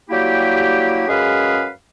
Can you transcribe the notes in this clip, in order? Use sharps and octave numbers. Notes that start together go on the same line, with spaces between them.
F#3 G3 A#3 E4 G4
F#2 G#3 C#4 G#4 B4 F5